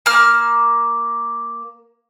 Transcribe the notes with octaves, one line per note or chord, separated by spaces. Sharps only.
A#3 F6